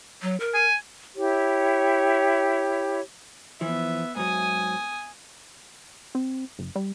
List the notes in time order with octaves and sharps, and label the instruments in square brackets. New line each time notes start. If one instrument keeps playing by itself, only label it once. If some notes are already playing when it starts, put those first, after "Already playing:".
[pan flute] F#3
A#4
[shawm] G#5
[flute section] E4 G4 C#5
[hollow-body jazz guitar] E3 F3 [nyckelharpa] B3 E5
[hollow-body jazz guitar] G#2 F#3 [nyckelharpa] G#5 D#6
[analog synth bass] C4
F#1
G3